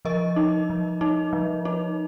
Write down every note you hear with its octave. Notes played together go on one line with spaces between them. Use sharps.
F3 A#4 D#5
D#4
F3
D#4
F3
D#4